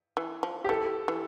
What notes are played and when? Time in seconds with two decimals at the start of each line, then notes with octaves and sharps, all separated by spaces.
0.17 E3
0.43 F3
0.64 G4
0.69 E3 A4
1.08 E3